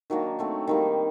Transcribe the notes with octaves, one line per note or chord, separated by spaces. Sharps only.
D#3 F#3 A#3 D4
F#3 A3 C4
D#3 G3 A#3